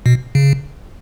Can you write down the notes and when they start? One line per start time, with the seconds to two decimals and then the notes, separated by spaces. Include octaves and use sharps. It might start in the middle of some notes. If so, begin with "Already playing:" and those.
0.06 B2
0.35 C#3